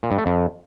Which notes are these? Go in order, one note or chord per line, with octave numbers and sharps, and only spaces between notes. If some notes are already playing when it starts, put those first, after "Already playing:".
A#2
G2
A3
F2